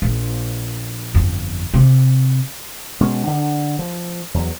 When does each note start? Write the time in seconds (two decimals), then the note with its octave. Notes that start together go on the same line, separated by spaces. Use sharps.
0.02 A#1
1.14 G1 F2
1.74 C3
3.01 B2 G#3 C#4
3.27 D3
3.79 F3
4.34 E2 F#3